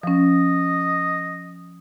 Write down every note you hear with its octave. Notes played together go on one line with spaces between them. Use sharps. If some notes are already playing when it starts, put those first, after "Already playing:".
F3 C#4 D#5